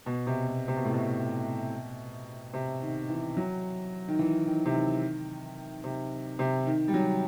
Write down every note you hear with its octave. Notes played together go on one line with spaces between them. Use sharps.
B2
C3
B2
C3
B2
A2
B2
C3
D#3
E3
F#3
D#3
E3
D#3
C3
D#3
C3
C3
D#3
G3
F#3